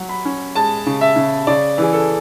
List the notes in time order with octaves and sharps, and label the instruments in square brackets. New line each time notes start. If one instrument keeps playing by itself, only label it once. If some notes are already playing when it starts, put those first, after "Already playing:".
Already playing: [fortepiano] F#3
[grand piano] B5
[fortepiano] C#4
[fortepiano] G#3 [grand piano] A5
[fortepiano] C#3
[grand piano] E5
[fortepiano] C#3
[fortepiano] C#3 [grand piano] D5
[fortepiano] E3 [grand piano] G#4
[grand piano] A4